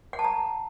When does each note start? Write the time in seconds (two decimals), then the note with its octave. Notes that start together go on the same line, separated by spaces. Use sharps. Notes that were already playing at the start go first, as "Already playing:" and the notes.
0.13 F#5
0.19 A5
0.25 A#5